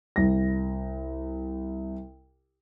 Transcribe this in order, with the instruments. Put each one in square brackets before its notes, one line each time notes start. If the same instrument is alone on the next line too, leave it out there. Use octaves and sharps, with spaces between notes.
[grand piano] C2 A#6